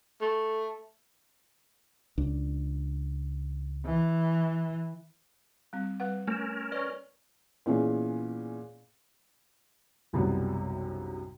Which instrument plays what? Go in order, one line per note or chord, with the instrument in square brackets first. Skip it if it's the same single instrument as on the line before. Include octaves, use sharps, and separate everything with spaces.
[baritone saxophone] A3
[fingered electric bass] C#2 D4
[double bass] E3
[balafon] G3 C4
G3 B4 F#5
[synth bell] A3 E7 [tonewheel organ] C#4 A#4
[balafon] B4 C#5 C#6 [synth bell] D5
[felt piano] A#2 E3 B3 C#4 G#4
B1 F#2 A2 C3 G3 B3